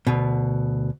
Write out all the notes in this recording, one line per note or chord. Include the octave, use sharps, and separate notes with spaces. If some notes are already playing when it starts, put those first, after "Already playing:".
D2 B2